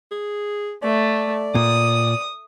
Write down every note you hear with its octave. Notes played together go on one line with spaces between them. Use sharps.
G#4
A3 D5
A#2 D#6